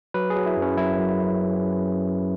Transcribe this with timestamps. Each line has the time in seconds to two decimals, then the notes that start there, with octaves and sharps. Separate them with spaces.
0.14 F#3 B4
0.30 G#4
0.36 F#3
0.46 E4
0.57 F#2
0.62 C#4
0.77 F#2 E4
0.99 F#2
1.20 F#2